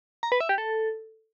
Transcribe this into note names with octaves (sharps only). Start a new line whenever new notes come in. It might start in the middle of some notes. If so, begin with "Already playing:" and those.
A#5
B4
E5
G4
A4